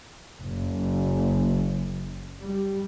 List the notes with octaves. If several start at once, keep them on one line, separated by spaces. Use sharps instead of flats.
F#1
G3